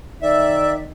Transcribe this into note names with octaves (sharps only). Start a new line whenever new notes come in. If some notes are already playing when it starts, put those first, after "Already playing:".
D#3 D5 E5